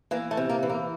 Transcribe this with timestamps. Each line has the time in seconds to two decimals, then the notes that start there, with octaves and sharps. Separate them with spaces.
0.11 E3 A#3
0.31 A3
0.37 C3
0.49 A#3
0.63 E3
0.70 A#3